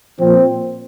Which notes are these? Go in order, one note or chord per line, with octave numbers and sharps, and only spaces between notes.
A#2 F3 C4